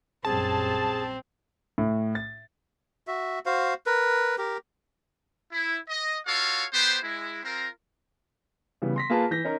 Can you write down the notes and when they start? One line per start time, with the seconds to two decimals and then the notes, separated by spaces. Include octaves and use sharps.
0.25 A#1 F#2 G3 C4 G#4 A5
1.78 A2
2.15 A6
3.07 F#4 E5
3.46 F#4 C5 F5
3.86 A#4 B4
4.38 G4 A#4
5.51 E4
5.89 D#5
6.27 F4 F#4 A4 C#5 F5
6.73 B3 G4 B4 C5
7.03 G#3 E4
7.44 C4 F4 A#4
8.82 C#3 E3 G3 B3
8.96 C6 A#6 B6
9.10 A#3 F4 G#4 B4 A5
9.31 E3 G6 A#6 B6
9.45 C#4 D#4 A#4